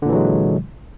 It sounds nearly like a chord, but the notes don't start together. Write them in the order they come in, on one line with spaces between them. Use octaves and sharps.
D3 A#2 E3 F#3 G#3